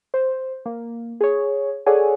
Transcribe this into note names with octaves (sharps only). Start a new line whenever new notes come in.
C5
A#3
G#4 C#5
G#4 A4 C#5 D5 F#5 G#5